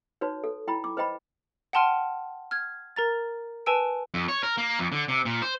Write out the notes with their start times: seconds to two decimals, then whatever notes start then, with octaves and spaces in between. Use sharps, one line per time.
0.21 D#4 F#4 B4 C#5
0.44 A4
0.68 E4 G5 B5
0.84 D6
0.97 B4 C5 D#5 G5 B5
1.73 F#5 G5 A5 C6 F6 D#7
2.51 F6 G#6
2.96 A#4 A#5 A6
3.66 B4 G#5 A5 E6 D7
4.14 F2
4.28 C#5
4.43 A#4
4.57 A#3
4.79 F2
4.92 D3
5.08 C3
5.25 A#2
5.42 C5